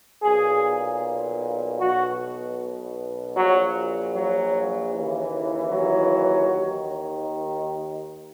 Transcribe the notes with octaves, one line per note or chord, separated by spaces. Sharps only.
B1 A#2 G#4
B1 B2 F#4
A#1 A#2 F#3
F#3
D#2 C#3 E3
F#3
D#2 D#3